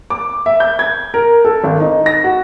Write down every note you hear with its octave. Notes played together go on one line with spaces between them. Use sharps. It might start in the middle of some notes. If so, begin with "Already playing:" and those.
D6
E5
G6
G#6
A#4
A4
G#1
D#4
A#6
F#4